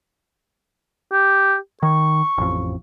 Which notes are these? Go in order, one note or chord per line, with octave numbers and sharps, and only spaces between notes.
G4
D#3 C#6
A1 F2